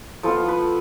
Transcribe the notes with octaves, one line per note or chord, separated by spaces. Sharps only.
F3 B3 F4 A4
B4